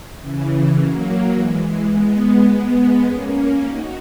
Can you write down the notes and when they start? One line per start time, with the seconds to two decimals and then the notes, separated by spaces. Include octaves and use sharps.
0.19 C#3 E3
0.77 F#3 A#3
1.34 E3 G#3
1.63 E3 G#3
1.92 G#3 B3
2.49 G#3 B3
3.07 A#3 C#4
3.64 D#4 F#4